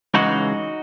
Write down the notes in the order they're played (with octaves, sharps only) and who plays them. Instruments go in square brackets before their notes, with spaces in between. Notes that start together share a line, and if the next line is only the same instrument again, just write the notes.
[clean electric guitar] C#2 C#3 E3 G#3 D#4 F#4